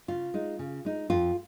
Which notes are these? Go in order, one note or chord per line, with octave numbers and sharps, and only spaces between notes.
C#3 F4
G#3 D#4
C#3
G#3 D#4
F2 F4